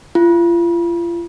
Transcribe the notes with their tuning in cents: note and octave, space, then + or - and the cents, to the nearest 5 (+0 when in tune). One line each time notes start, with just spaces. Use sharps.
F4 -35